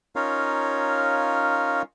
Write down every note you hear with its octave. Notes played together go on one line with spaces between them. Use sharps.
C#4 D#4 F4 A#4 C#5 F5